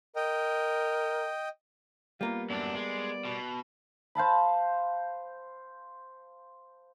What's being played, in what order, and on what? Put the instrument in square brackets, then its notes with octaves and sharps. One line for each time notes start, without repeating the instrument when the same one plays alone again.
[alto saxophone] A#4 [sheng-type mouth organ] D#5 G5
[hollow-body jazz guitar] G3 A#3 B3 [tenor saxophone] F4
[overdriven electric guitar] F#2 D4 [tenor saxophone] D5
[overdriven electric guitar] G#3
B2
[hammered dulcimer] C5 F5 A5 B5